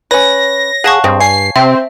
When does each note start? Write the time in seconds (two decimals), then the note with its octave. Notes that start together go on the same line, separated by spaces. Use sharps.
0.11 C#4 B4 C#5 A#6
0.84 G#4 F5 F#5 A5 C#6
1.04 G2 G#3 C4
1.20 G#5 C7
1.56 C3 C4 E5